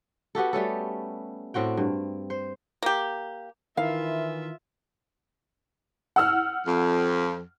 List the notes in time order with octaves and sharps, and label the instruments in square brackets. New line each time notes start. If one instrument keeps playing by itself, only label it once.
[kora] B3 F#4 G4 A4
G3 A3 C#4 A4
A2 C4 F#4 G5
G2
C5
[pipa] A#3 G4
[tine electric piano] D#3 E4 A#4 [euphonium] E3 [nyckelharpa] F4 E5 [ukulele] F5
[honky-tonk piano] F#5 E6 F6
[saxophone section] F2